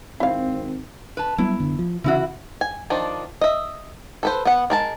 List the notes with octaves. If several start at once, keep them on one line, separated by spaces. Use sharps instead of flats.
G#1 C4 E4 F5
B4 A5
F#3 G3 B3 E4
F#1 D3 B3
F3
C#3 E3 C4 C#4 E4 F#4
G#5
D#3 F3 D4
D#5 E5
A4 B4 C5
B3 F#5
G#3 A#4 A5